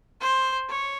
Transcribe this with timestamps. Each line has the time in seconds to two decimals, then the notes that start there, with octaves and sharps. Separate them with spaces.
0.21 C5
0.69 C#5